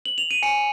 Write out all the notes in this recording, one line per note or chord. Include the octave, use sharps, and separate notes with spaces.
F#7
F7
D#7
G#5 C#7